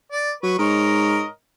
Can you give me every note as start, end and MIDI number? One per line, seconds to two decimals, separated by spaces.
0.12 0.31 74
0.43 0.56 54
0.43 0.56 71
0.43 0.56 85
0.59 1.23 44
0.59 1.27 70
0.59 1.27 73
0.59 1.27 75